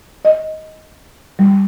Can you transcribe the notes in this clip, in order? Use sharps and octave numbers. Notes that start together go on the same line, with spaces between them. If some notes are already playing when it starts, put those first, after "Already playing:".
D#5
G3